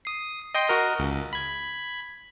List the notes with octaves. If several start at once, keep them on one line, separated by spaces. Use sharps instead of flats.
D#6 C7
D#5 G5 C6
F#4 A#4 D#5
C#2
B5 G#6